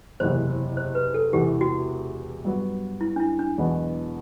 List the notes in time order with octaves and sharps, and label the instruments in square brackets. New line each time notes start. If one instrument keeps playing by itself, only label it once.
[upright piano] F#1 E2 C3 [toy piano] C5
[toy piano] C5
B4
A4
[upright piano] E1 E2 C3 E3 B3 [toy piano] G4
[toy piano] F#4
[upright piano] G2 F#3 B3
[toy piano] E4
D4
E4
D4
[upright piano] E1 E2 B2 F#3 B3